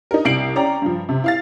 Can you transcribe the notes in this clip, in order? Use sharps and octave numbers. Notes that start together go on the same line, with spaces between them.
D#4 A#4
C2 C7 D7 F#7
C#4 D5 G5 A#5
G2 F3
C3
E4 F5 A6